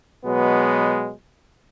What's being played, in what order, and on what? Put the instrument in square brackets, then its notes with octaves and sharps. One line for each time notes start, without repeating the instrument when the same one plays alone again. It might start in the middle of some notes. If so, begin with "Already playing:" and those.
[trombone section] B2 F#3 G#3 B3